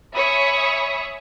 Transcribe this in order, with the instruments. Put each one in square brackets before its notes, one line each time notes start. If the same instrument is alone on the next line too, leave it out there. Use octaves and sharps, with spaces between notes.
[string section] C#5 E5 G#5 B5 C#6 D#6